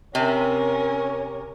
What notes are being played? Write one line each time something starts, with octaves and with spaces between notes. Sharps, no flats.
C3 C#4 A#4 C#5